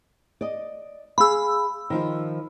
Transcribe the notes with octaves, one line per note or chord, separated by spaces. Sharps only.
D5 D#5
G#4 F5 B5 E6
D#3 F3 F4